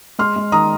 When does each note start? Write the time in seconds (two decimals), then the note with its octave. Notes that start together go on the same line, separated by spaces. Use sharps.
0.19 G#3 C6 F6
0.36 G#3
0.52 D#3 A#5 D#6